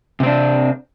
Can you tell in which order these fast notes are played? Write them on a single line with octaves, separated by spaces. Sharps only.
C3 C4 D4